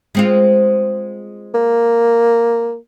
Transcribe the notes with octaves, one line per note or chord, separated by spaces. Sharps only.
G#3 C4 F4
A#3